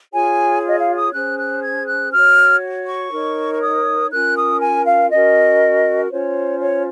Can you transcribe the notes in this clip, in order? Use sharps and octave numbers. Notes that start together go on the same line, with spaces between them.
F4 G#4 C#5 G#5
D#5
F5
D#6
C#4 G#4 C5 F#6
F#6
G#6
F#6
F#4 C#5 F6
C#6
D#4 A#4 C#5
C#6
D#6
C#4 F4 A#4 F#6
D#6
G#5
F5
C#4 F#4 A#4 D#5
C#4 F4 C5 C#5
C#5